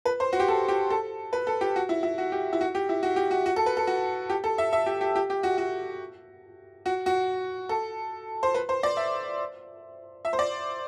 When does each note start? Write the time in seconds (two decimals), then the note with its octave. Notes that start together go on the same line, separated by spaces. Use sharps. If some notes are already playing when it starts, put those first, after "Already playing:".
0.05 B4
0.20 C5
0.33 F#4
0.40 G4
0.48 A4
0.68 G4
0.90 A4
1.33 B4
1.47 A4
1.61 G4
1.76 F#4
1.89 E4
2.03 E4
2.18 F#4
2.32 G4
2.53 E4
2.61 F#4
2.75 G4
2.89 E4
3.03 F#4
3.16 G4
3.31 F#4
3.46 F#4
3.56 A4
3.66 B4
3.77 A4
3.87 F#4
4.29 G4
4.44 A4
4.58 E5
4.73 E5
4.86 G4
5.01 G4
5.15 G4
5.30 G4
5.43 F#4
5.58 F#4
6.86 F#4
7.06 F#4
7.69 A4
8.43 C5
8.54 B4
8.69 C5
8.83 D5
8.97 E5
10.25 E5
10.33 C5
10.39 D5